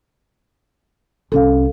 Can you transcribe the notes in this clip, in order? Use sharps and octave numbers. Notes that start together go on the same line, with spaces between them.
C2 C#4 A4 F5